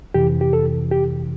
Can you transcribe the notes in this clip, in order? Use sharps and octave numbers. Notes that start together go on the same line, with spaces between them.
F2 C3 E3 G4
G4
A4
G4